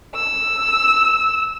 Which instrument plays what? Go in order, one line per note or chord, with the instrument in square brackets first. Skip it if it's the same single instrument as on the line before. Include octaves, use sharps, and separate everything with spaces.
[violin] E6